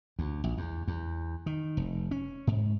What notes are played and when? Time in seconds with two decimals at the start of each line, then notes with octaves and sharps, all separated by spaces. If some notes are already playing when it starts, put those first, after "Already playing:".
0.19 D2
0.44 A#1
0.58 E2
0.88 E2
1.46 D#3
1.77 F1
2.11 C#4
2.47 G#2